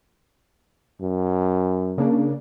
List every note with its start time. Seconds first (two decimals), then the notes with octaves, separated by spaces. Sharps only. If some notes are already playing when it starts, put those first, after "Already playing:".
1.01 F#2
1.98 C#3 A#3 D4